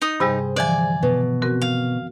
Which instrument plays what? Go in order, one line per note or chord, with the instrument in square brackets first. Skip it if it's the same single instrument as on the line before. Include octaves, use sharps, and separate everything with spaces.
[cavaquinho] D#4 D#6
[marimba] G2 C3 G3 [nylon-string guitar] G#4 C5
[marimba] D3 E3 F3 [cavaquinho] D5 G#5
[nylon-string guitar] B2
[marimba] C4 F#4 A#4
[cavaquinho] F5